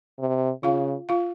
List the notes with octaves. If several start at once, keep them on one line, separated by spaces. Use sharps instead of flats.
C3
C#3 F4 F5
F4 F5